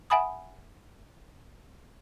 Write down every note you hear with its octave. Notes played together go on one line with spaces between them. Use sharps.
E5 F#5 G#5 B5 D#6